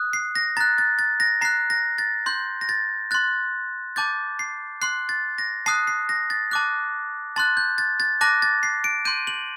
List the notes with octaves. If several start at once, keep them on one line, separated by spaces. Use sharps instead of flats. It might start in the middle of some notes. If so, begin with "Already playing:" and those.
Already playing: D#6 F#6
C7
A#6
A#5 F#6 A6
A6
A6
A#6
A#5 F#6 C7
A#6
A6
C6 G6
A#6
A6
C6 F#6 A6
A5 D6 G6 A6
C7
C6 F#6 C7
A6
A#6
A5 D#6 F#6 C7
C7
A#6
A6
A5 D6 F#6
A5 C6 F#6 A6
G6
A6
A6
A5 D6 F#6 A#6
A6
C7
D7
C6 G6 D#7
F#7